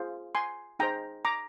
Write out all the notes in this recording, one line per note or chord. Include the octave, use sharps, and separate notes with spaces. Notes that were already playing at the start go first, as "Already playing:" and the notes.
Already playing: F4 G#4 C5
G#5 C6
D#4 G#4 C5 G5 A#5
A#5 D6